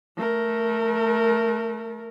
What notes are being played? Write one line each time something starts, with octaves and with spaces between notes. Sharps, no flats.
A3 A#4